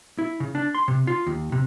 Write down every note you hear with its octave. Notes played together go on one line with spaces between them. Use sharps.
E4
C#3
D4
C6
C3
F4
D#2
C3